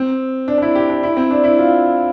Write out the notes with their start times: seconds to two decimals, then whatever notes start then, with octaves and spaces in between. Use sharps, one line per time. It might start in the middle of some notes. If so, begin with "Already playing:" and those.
Already playing: C4
0.48 D4
0.58 D4
0.62 E4
0.75 G4
0.89 D4
1.03 E4
1.17 C4
1.31 D4
1.44 E4
1.58 F4